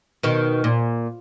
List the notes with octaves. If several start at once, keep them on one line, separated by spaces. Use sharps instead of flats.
B2 D#3
A#2